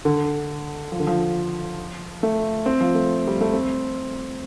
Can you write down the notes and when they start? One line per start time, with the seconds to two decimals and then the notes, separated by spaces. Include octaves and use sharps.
0.05 D3
0.92 F3
1.00 D3
1.07 F3
2.23 A3
2.66 C4
2.81 F3
2.95 A3
3.27 G3
3.41 A3
3.53 C4